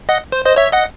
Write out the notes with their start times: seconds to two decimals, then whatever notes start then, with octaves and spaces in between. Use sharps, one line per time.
0.09 D#5 F#5
0.32 C5
0.45 C5 D#5
0.56 C#5 E5
0.72 D#5 F#5